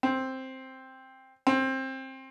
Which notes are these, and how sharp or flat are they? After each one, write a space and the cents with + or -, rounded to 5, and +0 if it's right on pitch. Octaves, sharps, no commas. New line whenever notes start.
C4 +5
C4 +20